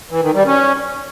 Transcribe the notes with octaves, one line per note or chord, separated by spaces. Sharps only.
E3
D#3
G3
C#4